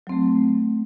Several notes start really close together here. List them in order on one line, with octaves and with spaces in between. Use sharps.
F#3 C4 A3